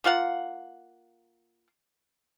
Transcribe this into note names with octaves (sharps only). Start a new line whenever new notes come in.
A#3 F4 F5 F#5